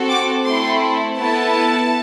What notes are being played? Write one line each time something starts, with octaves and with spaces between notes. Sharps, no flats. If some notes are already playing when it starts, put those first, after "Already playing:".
Already playing: C4 F#4 A4
D6
A3 C4 E4 A4 C6
B3 E4 A4 A5